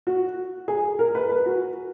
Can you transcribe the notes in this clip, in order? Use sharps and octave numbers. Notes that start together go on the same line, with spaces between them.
F#4
G#4
A#4
B4
B4
F#4